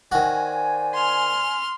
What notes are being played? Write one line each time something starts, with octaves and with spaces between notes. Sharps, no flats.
D#3 F#4 C5 D5 G#5
C6 F6